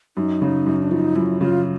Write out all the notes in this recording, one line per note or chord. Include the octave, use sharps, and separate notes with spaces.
F#2 D#4
C#3
F#2
D4
F3 D#4
F#2 E4
C#3 F4